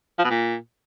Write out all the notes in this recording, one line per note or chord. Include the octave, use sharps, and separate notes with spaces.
F3
B2
A#2